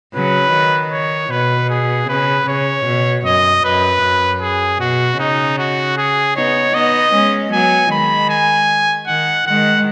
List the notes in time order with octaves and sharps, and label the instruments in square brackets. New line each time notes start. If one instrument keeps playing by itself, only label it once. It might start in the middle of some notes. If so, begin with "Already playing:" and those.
[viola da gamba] C#3 F#3 [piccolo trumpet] B4
[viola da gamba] D#3
[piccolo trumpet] C#5
[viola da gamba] B2 [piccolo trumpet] B4
[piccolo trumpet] G#4
[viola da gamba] C#3 [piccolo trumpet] B4
[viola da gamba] C#3 [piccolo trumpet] C#5
[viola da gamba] B2
[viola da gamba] F#2 [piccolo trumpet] D#5
[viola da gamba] F#2 [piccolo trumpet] B4
[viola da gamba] F#2
[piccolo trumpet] G#4
[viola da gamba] B2 [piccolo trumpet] F#4
[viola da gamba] C#3 [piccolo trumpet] D#4
[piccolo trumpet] F#4
G#4
[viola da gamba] B3 D#4 [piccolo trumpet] C#5
[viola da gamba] B3 D#4 [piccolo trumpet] D#5
[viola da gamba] G#3 C#4
[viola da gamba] F#3 B3 [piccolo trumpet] G#5
[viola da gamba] D#3 G#3 [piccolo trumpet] B5
[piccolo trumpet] G#5
[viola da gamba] D#3 [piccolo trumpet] F#5
[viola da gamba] D#3 G#3 [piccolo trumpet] F#5